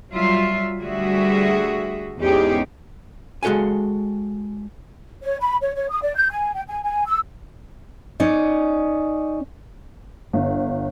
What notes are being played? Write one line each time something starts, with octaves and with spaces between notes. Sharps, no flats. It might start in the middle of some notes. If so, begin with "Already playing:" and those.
F#3 G3 F4 E5
D2 G3 F#4 G#4 E5
E2 G#2 C#4 D#4 G4 G#4
G#3 F#4 A4 F5 G#5
C#5
B5
C#5
C#5
D#6
D5
G6
G#5
G5
G#5
G#5
E6
C#4 D#4 D5
G1